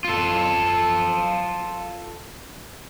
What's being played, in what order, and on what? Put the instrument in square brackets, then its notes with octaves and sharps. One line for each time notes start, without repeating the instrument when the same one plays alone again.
[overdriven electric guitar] F4 A4